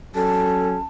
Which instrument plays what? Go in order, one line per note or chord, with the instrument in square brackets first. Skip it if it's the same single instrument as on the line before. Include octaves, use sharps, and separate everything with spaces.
[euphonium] F#3 [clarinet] C#4 [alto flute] A4 [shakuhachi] A5